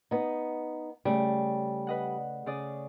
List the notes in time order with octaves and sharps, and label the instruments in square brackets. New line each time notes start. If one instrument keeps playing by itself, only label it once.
[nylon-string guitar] B3 D#4
[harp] C#3 A3 [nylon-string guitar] G3
[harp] B4 D#5 F#5
C#3 D5 D#6